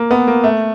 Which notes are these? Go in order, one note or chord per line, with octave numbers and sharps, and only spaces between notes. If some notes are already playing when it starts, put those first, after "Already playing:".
Already playing: A#3
B3
A#3
A3